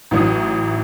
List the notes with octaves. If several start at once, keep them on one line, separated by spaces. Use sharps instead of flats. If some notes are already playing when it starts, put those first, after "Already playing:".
A1 E3 F#3 D#4 D#6